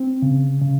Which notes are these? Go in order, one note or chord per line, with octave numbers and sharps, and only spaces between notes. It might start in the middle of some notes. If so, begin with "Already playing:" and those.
Already playing: C4
C#3
C#3